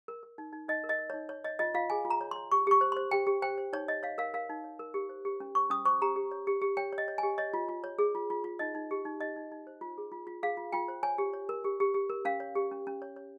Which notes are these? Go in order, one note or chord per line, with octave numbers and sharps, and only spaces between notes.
A#4
A#4
D#4
D#4
D#4 D#5
A#4
D#5
A#4
C#5
D#4
C#5
C#5 D#5
F4 D#5
F4 F5
G#4 G#5
F4
A#5
C#5
C6
C#5
G4 C#6
G4 C#6
C5
C6
C5
G4 G5
G4
C5 G5
C5
D#4 C#5
C#5 D#5
C#5 F5
A#4 F5
A#4 F5
D#4
C#5
A#4
G4
C5
G4
C#4
C5 C#6
C#4 D#6
C5 C#6
G4 A#5
G4
C#5
G4
G4
C#5 G5
C#5
D#5
C#5
G#5
G4
C#5 D#5
F4
F4
C#5
G#4
F4
F4
F4
D#4 D#5
D#4
G4
D#4
D#4 D#5
D#4
D#4
C5
F4
G#4
F4
F4
G#4 F5
F4
F4 G5
C5
C#5 G#5
G4
C#5
A#4
G4
G4
G4
A#4
C#4 F5
C#5
G4
C#4
C#4
C#5
C#5